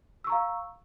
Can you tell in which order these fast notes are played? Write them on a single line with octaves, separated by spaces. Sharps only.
E6 C#6 A#5 F5